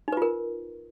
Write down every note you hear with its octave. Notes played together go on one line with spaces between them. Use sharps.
D#4 F4 A#4 B4